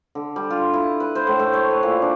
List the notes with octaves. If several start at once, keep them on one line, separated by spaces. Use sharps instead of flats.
D3
G3
F4
E4
B4
C5
A2
A3
C#5
B4
A#2
D4